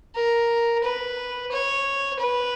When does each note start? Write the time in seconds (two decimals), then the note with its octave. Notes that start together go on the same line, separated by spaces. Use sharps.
0.15 A#4
0.83 B4
1.51 C#5
2.19 B4